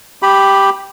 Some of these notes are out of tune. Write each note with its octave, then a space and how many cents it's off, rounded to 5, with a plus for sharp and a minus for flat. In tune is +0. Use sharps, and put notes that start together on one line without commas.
G4 +0 B5 +0 D6 +45